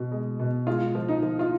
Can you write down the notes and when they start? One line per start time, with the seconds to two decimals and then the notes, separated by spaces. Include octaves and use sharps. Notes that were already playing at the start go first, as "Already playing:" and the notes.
Already playing: B2
0.12 G#3
0.40 B2
0.67 G#3 F4
0.95 F3
1.08 D#4
1.23 F3
1.39 F4